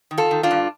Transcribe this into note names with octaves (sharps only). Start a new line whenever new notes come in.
D#3
F4 A4
D#3
D4 F4
G2